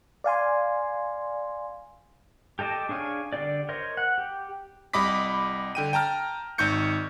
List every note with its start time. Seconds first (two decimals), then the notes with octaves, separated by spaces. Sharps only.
0.24 D5 F5 G#5 C6
2.59 G4 A4 D#5 A5 D6
2.89 D4 G#4 C#5 F5 G#5
3.33 D3 D4 D#4 G4 D5
3.69 A#4 C5 C#5 D#5
3.97 F#5
4.18 G4
4.93 C2 G3 D#5 B5 D6 B6
5.75 D3 G5 D#7
5.93 G5 A5 A#5 F6
6.58 G#1 D#4 C#6 G6 C#7